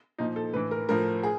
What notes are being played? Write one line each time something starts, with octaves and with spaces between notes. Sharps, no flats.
A#2 F3 D#4
A4
A2 E3 B4
A#4
A2 F3 A#4
G#4